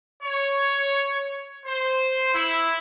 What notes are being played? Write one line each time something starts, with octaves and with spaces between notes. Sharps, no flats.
C#5
C5
E4